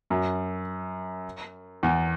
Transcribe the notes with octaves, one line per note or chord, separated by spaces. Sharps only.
F#2
E2